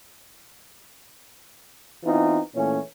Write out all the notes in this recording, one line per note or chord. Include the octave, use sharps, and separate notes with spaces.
E3 B3 C4 D#4 F4
A#2 E3 A3 C#4